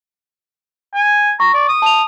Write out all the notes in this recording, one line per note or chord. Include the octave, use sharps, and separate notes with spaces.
G#5
A#5 C#6
D5
D#6
A5 F7